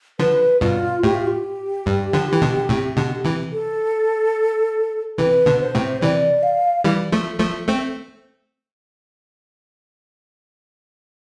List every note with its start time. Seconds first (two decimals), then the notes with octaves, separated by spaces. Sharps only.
0.19 D3 F3 B4
0.61 G2 B2 F4
1.03 A2 G4
1.14 F4
1.27 G4
1.86 G2
2.13 D3 F3
2.33 E3
2.41 B2 D3
2.69 A2 C3
2.97 B2 D3
3.24 C3 E3
3.53 A4
5.18 C3 E3 B4
5.46 B2 D3
5.61 C5
5.75 A2 C3
6.02 C3 E3 D5
6.43 F5
6.84 E3 G3
7.12 F3 A3
7.40 F3 A3
7.68 A3 C4